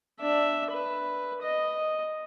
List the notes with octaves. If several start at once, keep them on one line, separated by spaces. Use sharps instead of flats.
D4 E5
B4
D#5